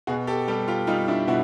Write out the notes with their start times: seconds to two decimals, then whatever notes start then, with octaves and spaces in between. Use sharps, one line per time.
0.07 B2 F#4 G#4
0.27 G4 A4
0.48 G3 G4 A4
0.68 F4 G4
0.87 G3 D#4 F4
1.08 D4 E4
1.27 B2 E4 F#4